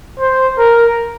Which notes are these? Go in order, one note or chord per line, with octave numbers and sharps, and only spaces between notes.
C5
A#4